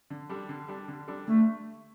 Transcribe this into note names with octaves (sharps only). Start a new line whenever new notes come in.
D3
G3 D4 A4
D3
G3 D4 A4
D3
G3 D4 A4
D3 A3